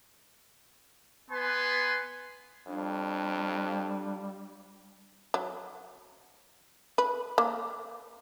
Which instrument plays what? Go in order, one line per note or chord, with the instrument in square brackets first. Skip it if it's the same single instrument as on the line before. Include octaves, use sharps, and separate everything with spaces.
[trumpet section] B3 B4 G#5 C6
[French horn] F2 [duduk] G3 [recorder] D4
[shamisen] F#3
B4
A#3